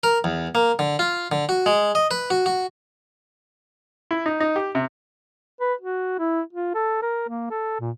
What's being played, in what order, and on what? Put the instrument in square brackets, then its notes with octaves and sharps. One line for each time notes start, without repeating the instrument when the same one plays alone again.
[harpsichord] A#4
E2
A#3
D3
F4
D3
F#4
G#3
D#5
B4
F#4
F#4
[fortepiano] E4
D#4
D#4
G4
C3
[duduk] B4
F#4
E4
F4
A4
A#4
A#3
A4
A#2